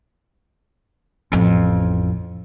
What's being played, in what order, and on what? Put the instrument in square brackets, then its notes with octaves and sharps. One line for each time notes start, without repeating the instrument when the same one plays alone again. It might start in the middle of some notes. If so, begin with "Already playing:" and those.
[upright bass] A1 F2